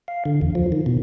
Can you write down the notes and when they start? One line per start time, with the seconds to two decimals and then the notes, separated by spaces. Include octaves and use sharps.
0.08 F5
0.25 D3
0.41 E2
0.55 F3
0.72 D#3
0.86 B2